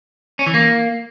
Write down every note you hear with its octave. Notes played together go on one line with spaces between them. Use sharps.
C#4
E3
A#3